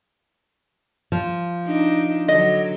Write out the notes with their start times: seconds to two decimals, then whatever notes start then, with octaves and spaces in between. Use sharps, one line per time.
1.12 F3
1.66 D4 D#4
2.28 D3 F#3 D#5